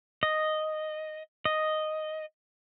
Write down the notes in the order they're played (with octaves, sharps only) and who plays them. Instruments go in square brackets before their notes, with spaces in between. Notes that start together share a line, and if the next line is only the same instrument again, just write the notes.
[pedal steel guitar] D#5
D#5